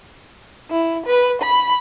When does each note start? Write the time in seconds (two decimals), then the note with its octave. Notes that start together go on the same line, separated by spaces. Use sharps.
0.71 E4
1.06 B4
1.42 B5